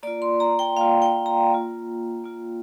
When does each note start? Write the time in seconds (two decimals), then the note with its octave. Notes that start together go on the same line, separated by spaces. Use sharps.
0.03 A#3 F4 D5
0.22 C6
0.40 A#5
0.59 G5
0.77 A#3 F4 F5
1.02 G5
1.26 A#5
1.50 A#3 F4
2.24 A#3 F4